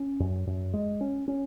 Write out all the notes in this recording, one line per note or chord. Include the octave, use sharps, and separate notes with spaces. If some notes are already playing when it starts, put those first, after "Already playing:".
Already playing: C#4
F#2
F#2
G#3
C#4
C#4